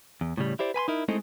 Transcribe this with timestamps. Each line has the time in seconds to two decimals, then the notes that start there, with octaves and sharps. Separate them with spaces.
0.21 E2
0.37 A2 C#3 G3
0.59 E4 G4 C5 D5
0.74 B4 G#5 B5 C6
0.88 D#4 E4 A#4
1.08 G#3 A3 C4 D#4 E4 A4